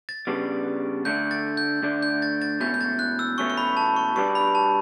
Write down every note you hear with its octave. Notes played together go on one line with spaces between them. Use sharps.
A6
C#3 G3 B3 D4
D2 D3 A3 D4 G6
A6
G6
D2 D3 A3 D4
G6
A6
A6
E2 B2 A3 C#4 G6
G6
A6
F#6
E6
E2 B2 A3 C#4 C#6
C#6
B5
A5
C#6
B2 G3 B3 D4 C#6
B5
A5